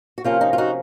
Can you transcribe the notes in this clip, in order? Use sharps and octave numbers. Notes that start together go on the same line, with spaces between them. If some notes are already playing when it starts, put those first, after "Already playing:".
F#4
C3 F3 A#3 C#4 F4
D#4
F4
D#4 F#4